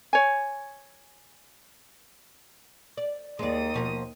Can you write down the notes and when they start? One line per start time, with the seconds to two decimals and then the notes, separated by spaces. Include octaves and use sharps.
0.13 C#5 G#5
2.97 D5
3.39 D#2 G#3 D5 D#6
3.74 B2 F3 A#3